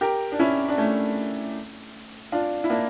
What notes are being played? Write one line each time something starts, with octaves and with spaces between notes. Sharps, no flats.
G4 A#4
D4
C#4 E4
D4
A3 C#4
D4 F4
E4
A#3 D4